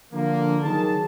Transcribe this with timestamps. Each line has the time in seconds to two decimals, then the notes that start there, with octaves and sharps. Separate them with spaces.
0.12 D3 F3 A#3
0.63 D#3 F#3 G#4 A5